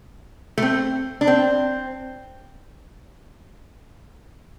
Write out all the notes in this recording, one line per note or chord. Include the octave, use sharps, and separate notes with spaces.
A3
C4
D4
C4